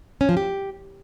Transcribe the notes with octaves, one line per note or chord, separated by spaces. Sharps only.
C#4
F3
G4